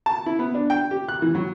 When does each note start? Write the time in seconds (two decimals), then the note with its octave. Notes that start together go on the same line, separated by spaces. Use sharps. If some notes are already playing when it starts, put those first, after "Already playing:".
0.06 A5
0.26 E4
0.39 B3
0.55 D4
0.70 G5
0.91 G4
1.09 F#6
1.22 E3
1.35 F#3